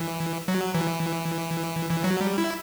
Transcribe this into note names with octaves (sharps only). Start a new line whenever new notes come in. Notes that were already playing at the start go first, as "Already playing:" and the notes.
Already playing: E3
F#3
E3
E3
F#3
G3
E4